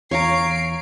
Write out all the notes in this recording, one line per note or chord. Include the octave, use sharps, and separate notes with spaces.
E2 C#5 F5 A#5 C7 D7